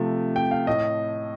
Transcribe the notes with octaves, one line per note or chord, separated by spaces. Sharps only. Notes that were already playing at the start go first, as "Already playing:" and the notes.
Already playing: C3 F3 A3
G5
F5
A2 D#5